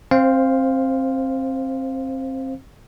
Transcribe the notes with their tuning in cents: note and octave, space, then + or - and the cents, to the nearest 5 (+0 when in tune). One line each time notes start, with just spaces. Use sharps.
C4 +25 C5 +0 F5 +0